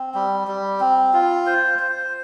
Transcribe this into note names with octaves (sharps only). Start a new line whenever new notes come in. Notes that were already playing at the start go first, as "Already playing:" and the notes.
Already playing: C4
G3
G3
C4
F4
C5
C5